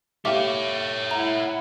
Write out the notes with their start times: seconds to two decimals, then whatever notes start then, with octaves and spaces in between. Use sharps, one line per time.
0.25 G4 A4 C#5 E5 F5 D6
1.11 E4 F#5 A#5